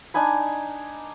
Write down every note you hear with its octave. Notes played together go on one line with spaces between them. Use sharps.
D4 D#4 G#5 B5